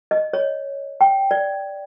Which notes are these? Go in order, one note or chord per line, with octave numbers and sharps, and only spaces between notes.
D#5
C#5
G5
D5